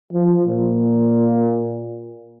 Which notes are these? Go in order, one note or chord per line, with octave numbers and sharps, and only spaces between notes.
F3
A#2